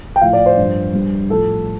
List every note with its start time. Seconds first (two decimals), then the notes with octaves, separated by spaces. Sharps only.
0.16 G5
0.21 A2 F3 F5
0.33 D5
0.46 C5
0.57 G2 F3
0.93 G2 G3
1.30 A2 F3 A4